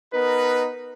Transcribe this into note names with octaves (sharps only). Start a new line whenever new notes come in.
B3 D#4 A#4 B4